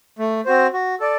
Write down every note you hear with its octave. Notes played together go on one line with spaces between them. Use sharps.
A3
C4 F#4 C5
F#4
A4 D5